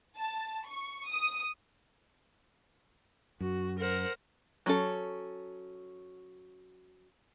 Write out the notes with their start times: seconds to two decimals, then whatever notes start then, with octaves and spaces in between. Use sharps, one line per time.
0.17 A5
0.66 C#6
1.09 D#6
3.40 F#2 F#4
3.79 A#4 C5 F#5
4.66 F#3 C#4 A4